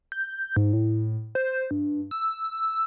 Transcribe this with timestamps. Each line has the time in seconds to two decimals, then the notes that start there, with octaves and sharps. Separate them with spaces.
0.12 G6
0.56 G#2
0.73 A2
1.35 C5
1.71 G2
2.11 E6